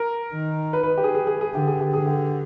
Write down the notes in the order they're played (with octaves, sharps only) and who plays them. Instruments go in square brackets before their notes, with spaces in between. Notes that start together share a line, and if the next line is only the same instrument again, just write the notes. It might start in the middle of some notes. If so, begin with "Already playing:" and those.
Already playing: [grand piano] A#4
[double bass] D#3
[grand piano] B4
B4
G4
G#4
G#4
G#4
G#4
[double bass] D3 [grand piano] G4
[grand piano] G#4
G4
[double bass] D3 [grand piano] G#4
[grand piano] G4